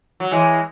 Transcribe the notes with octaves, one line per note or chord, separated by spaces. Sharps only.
F#3
E3 G#3